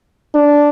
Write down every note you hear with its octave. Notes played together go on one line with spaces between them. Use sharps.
D4